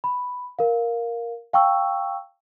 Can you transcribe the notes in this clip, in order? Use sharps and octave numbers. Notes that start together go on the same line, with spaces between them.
B5
A#4 F5
F5 G5 A5 C#6 E6